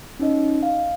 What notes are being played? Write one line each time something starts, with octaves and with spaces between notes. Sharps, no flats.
C#4 D#4 D#5
F5